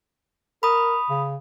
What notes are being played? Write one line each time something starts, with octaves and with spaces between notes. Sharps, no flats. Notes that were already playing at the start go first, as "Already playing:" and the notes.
A#4 B5 D#6
C#3